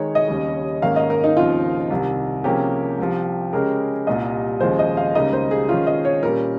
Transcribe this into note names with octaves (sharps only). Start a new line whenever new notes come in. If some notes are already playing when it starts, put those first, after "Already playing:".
Already playing: D#3 G#3 D#4 C#5
D#5
D#2 C#3 G3
G#2 D#3 A#3 C#4 F5
D#5
A#4
D#4
D#2 C#3 F3 C4 F4
C2 C3 D#3
C3 F3 A#3 C#4 G4 G#4
C2 C3 F3
C#3 G#3 C#4 G4 G#4 A#4
C2 A#2 G3 D#5
D#2 C#3 F3 G#3 C5
D#5
F5
C#2 C#3 G3 A#3 D#4 D#5
C5
G#4
D#3 G#3 C#4 F4
D#5
C#5
A#2 G3 C#4 A#4